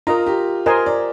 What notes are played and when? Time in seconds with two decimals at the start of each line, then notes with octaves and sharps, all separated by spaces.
0.07 F4 A#4 D#5 A#5
0.26 G4
0.66 A#4 C5 D#5 G#5 C6
0.86 D5